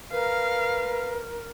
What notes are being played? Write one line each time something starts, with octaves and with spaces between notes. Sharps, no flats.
A#4 B4 F5